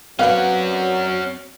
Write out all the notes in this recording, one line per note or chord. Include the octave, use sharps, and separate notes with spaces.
F#3 C4 C#4 B4 D5 F5 F#5